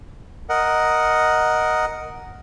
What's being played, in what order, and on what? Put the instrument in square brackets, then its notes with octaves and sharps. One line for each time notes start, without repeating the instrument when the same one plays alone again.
[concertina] A#4 D#5 F#5